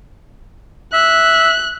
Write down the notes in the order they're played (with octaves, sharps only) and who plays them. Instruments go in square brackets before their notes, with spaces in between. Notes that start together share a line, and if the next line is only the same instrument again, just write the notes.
[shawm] E5 [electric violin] F#6